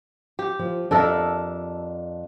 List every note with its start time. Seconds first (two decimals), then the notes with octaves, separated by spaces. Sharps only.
0.39 G4
0.59 F3
0.91 F2 D4 A4 A#4 E5